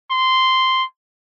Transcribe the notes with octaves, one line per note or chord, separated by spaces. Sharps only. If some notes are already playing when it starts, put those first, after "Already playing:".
C6